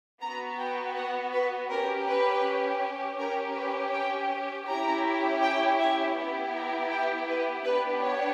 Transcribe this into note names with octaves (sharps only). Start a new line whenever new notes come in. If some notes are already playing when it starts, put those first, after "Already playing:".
B3 F#4 A#5
G5
F#5
B4
C#4 G4 A#4
B4
C#4 G4 A#4
B4
G5
C#4 E4 G4 A#5
G5
E5
B3 E4 G4
A#5
G5
B4
B3 D4 G4 B4
C#5